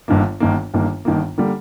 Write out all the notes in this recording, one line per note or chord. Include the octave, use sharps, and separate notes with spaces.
G1 G2 D#3 A#3
G1 G2 D#3 A#3
G1 G2 D#3 A#3
G1 G2 D#3 A#3
D3 G3 A#3